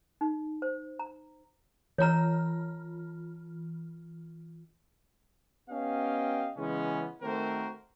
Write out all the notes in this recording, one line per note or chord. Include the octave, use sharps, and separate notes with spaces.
D#4
C5
A#5
E3 F4 C#5 A#5 F6
B3 C#4 G4 D#5 F5 G5
C#3 E3 G#3 B3 C#4
D#3 A3 C4 F#4 A#4 C5